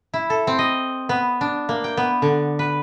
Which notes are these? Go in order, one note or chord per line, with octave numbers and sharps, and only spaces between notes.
E4
A4
C4
D#5
B3
D4
A#3
G5
B3
D3
B4